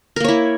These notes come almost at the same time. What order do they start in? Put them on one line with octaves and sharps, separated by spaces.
A#4 A#3 C#5 E4